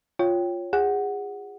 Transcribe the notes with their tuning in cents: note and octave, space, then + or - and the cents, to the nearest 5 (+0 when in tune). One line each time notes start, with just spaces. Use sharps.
F4 +5 C#5 +0 G5 +0
G#4 -30 F#5 +0